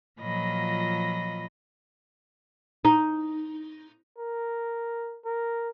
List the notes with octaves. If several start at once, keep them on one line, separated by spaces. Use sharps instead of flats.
A#2 F3 F#3 D#5 B5 A#6
D#4
A#4
A#4